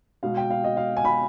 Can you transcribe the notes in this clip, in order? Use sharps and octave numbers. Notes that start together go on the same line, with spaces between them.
B2 G#3 F5
G5
F5
D#5
F5
G#5
B5